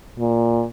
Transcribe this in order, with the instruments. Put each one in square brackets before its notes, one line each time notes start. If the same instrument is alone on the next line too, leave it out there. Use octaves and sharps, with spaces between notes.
[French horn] A#2